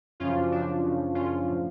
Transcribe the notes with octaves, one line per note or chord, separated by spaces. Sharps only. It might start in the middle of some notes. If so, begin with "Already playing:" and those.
F#2 C#3 F3 C#4 F4
D4
F#2 C#3 F3 D4
F#2 C#3 F3
F#2 C#3 F3 C#4 F4
A2 F3